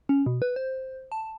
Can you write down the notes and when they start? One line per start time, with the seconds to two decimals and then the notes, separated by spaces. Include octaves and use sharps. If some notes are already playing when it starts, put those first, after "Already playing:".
0.09 C#4
0.26 B2
0.42 B4
0.56 C5
1.12 A5